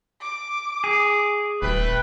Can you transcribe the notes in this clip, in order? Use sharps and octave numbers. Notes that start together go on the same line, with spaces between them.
D6
G#4
D#1 A3 B4 G5